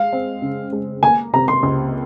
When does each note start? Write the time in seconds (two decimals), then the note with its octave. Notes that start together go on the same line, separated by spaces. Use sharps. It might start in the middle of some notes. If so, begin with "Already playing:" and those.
Already playing: G#3 F5
0.13 C4
0.42 C#3
0.73 G#3
1.03 A#3 G#5
1.33 C3 A#5
1.48 C6
1.63 C#2